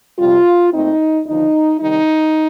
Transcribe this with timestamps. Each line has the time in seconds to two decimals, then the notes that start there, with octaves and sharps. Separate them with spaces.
0.19 F2 C3 G3 F4
0.73 A#2 A3 C4 D#4
1.27 D#2 D3 F3 D#4
1.80 C3 D#3 G3 D#4